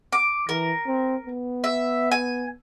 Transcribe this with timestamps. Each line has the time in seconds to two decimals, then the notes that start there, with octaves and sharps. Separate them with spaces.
0.12 D6
0.49 E3 A#4
0.87 C4
1.26 B3
1.64 E5
2.12 G#5